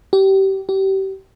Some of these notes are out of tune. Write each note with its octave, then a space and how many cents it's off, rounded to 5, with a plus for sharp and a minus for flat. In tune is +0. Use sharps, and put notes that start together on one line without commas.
G4 -25
G4 -30